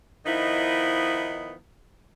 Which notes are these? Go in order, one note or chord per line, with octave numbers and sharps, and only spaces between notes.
D#3 F3 B3 D#4 E4